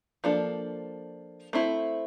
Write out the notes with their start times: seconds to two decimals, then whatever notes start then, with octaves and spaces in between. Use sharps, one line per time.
0.24 F3 A#3 D4 A4
1.53 A3 C4 E4